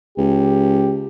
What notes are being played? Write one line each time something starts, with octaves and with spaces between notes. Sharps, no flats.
C#2 G4